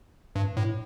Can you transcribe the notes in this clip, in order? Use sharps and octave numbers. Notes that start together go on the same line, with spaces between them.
G2
A2